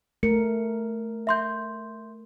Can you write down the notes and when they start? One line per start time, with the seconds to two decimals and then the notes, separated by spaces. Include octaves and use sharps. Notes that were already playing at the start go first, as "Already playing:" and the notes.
0.23 A3 A#4 C#7
1.27 E5 C6 G6